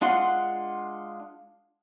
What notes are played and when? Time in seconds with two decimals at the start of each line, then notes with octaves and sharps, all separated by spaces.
0.01 G#3 D4 F4 F#5 C6